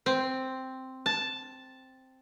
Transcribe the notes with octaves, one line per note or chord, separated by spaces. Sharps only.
C4
A5